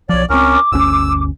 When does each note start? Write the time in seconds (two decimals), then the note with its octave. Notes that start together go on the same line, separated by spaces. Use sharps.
0.09 B1 F3 C#5 D5
0.30 C#2 C4 C#4 A#4 D6
0.72 G1 D2 C#4 E6